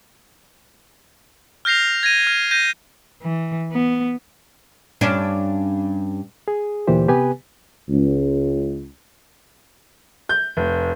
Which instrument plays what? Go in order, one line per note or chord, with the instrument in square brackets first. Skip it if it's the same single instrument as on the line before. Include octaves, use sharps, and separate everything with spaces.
[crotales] F6 G6 A#6 C7 F7
G#6 A#6 D#7
F6
G6 A#6 D#7
[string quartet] E3
B3
[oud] G2 C#4 D4
[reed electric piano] G#4
D2 A#2 E3 G4 C5
C3 B3 G4 B4 G#5
[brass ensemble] C#2
[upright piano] G6
F1